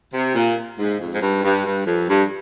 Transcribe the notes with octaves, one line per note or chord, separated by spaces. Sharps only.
C3
A#2
G#2
F2
G#2
G2
G2
G2
F2
G2